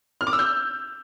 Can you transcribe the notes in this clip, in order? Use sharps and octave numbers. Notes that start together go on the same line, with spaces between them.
F6
D6
E6
G6